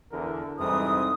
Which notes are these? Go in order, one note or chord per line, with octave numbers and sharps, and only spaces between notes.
E2 D3 A#4
F2 G#2 C3 E3 G3 D#6